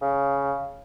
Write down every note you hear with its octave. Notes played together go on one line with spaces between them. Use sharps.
C#3